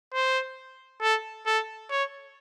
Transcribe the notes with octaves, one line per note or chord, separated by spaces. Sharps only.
C5
A4
A4
C#5